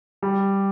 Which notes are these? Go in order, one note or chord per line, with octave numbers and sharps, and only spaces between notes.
G3